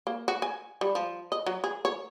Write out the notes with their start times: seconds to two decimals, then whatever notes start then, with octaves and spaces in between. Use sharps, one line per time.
0.07 A#3
0.28 F#4
0.42 G#5
0.81 G3
0.95 F3
1.32 D#5
1.46 F#3
1.64 G#4
1.85 C#5